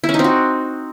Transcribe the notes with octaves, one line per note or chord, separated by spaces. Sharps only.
E4
C#4
D#4
C4
F#4